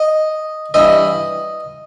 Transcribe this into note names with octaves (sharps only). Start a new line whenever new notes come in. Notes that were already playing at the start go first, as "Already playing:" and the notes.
Already playing: D#5
G2 E3 D#5